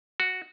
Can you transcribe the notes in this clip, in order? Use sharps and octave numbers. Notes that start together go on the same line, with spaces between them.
F#4